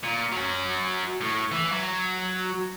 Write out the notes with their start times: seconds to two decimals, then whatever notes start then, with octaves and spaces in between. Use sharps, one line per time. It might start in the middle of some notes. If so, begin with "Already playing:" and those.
0.04 A#2
0.32 F#3 C#4
1.21 A2
1.51 E3
1.72 F#3